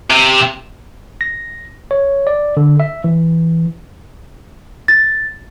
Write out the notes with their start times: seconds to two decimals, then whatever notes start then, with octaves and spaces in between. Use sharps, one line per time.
0.11 C3
1.21 A#6
1.91 C#5
2.27 D5
2.57 D3
2.80 E5
3.04 E3
4.88 A6